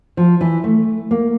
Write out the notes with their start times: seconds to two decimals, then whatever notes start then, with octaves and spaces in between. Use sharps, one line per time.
0.17 F3
0.41 E3
0.64 A3
1.11 A#3